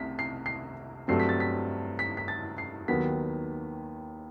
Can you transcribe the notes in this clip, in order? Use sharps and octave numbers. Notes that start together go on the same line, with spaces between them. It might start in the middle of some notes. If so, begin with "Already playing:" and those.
Already playing: C2 C3 A3 B6
C7
C7
G2 F#3 A3 C4 C7
B6
A6
B6
B6
B6
A6
C7
D#2 D#3 F#3 B3 B6